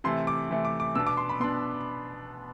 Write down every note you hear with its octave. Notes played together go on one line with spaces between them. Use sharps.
C3 E3 A3 C6
D6
C3 E3 A3
D6
D6
B2 B3 D4 E6
D6
C6
B5
B2 B3 D4 C6